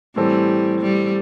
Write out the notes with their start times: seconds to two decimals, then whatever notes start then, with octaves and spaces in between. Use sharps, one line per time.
0.16 A2 E3 G3 C4 A4
0.81 G3